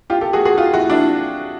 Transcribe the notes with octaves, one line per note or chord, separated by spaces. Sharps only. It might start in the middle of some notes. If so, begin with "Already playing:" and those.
F4 G4
G4 A4
F#4 G#4
F#4 G#4
F4 G4
E4 F#4
D4 E4